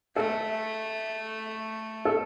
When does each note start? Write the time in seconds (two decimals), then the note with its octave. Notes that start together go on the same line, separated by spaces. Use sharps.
0.16 A3 A4
2.05 A4